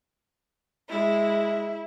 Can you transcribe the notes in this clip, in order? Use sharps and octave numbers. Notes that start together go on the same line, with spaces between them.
G#3 E4